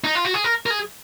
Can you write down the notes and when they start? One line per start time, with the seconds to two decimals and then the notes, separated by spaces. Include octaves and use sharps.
0.04 D#4
0.15 F4
0.25 F#4
0.34 G#4
0.44 A#4
0.66 A#4
0.70 G#4